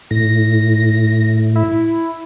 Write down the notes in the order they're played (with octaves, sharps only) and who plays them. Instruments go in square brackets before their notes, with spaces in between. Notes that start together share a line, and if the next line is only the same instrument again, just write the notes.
[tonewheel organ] A2 [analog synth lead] A#6
[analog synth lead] E4